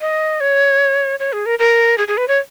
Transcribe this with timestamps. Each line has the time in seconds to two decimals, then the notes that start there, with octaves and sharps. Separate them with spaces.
0.01 D#5
0.40 C#5
1.19 C#5
1.33 G#4
1.46 A#4
1.59 A#4
1.98 G#4
2.08 G#4
2.17 B4
2.28 C#5